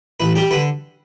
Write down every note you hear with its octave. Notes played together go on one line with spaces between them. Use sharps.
A1 B4
G3 G4
D3 B4